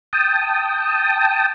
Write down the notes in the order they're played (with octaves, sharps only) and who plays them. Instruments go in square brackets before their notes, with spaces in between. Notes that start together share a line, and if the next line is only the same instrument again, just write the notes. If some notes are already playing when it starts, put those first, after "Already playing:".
[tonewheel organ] G5 A5 D#6